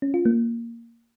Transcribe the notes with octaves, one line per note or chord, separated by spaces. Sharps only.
C#4
F4
A#3